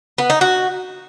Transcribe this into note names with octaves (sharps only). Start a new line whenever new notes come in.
B3
D#4
F#4